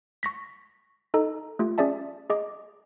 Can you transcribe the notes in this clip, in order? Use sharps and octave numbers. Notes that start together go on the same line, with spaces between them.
C#6 A#6 B6
D#4 A4 D#5 A#5
A3 F4 G4
C#4 G#4 D5 E5 A5
G#4 D#5 D6